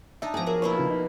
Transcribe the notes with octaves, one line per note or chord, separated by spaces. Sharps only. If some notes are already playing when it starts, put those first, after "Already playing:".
D4 D#4 E5 A5
F3 B3 D5 G#5 A#5
F#3 G#4 A#4
B2 A#3 E4 C#5
C#3 D#4 F4
D#4